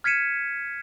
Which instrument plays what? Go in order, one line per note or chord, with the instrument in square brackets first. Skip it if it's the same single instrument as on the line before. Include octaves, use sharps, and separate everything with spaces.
[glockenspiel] F6 G#6 B6 C#7 D#7 E7